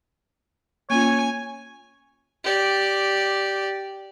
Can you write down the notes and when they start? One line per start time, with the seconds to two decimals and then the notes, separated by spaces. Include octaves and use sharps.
0.90 A#3 C#4 F4 C#5 G#5
2.44 G4 D5